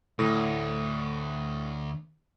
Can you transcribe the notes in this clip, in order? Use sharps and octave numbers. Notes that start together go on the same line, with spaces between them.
D2 A2 A#6